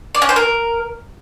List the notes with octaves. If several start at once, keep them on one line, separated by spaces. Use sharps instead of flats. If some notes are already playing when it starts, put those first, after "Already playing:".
D5
C#4
C5
A#4